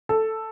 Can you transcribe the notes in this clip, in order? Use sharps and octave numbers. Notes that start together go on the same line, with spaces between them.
A4